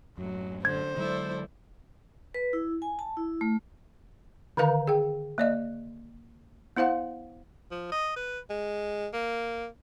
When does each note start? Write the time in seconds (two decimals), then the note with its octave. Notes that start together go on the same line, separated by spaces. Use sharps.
0.18 F#2 A2 F#3
0.65 D3 C5 G#6
0.97 D3 F#3 G#3 E4 A4 D5
2.34 B4
2.53 E4
2.82 G#5
2.99 A5
3.17 E4
3.41 A3
4.57 D3 D#3 A#4 B4 F5 A#5
4.87 G#4 G5
5.38 A#3 D5 D#5
6.77 B3 E4 C5 F5 F#5
7.71 F3
7.92 D#5
8.16 B4
8.50 G#3
9.14 A#3